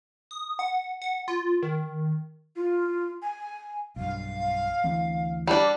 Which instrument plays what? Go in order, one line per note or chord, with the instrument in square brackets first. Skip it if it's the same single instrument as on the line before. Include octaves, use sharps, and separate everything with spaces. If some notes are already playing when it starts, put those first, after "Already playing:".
[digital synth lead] D#6
F#5
F#5
F4
D#3
[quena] F4
G#5
[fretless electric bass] B1 G2 [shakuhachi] F5
[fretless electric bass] D2 E3 C4
[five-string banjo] G3 D4 [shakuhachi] G4